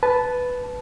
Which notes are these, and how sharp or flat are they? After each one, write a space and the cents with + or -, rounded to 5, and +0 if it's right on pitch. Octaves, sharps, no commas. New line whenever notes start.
B4 +5 A5 -15